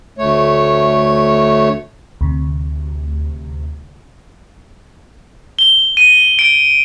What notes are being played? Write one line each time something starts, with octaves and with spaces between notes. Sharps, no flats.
D2 A3 C#5
D2 C3
G7
D#7
D7